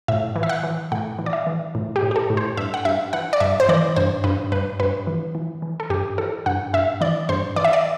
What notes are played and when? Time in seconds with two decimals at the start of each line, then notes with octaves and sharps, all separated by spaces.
0.08 A2 E5
0.36 E3
0.43 E5
0.49 F#5
0.63 E3
0.92 A2 F#5
1.19 E3
1.26 D5
1.33 E5
1.47 E3
1.75 A2
1.96 G4
2.03 A2
2.11 G4
2.16 A4
2.30 A2
2.37 C5
2.57 G2 E5
2.74 F#5
2.85 G2 E5
3.13 E3 F#5
3.33 D5
3.40 G2 E5
3.60 C5
3.69 E3 D5
3.96 G2 C5
4.24 G2 B4
4.52 G2 B4
4.80 G2 B4
5.07 E3
5.35 E3
5.62 E3
5.80 A4
5.90 G2 G4
6.18 E3 A4
6.46 G2 F#5
6.74 G2 E5
7.01 E3 D5
7.29 G2 C5
7.56 E3 D5
7.65 E5
7.73 D5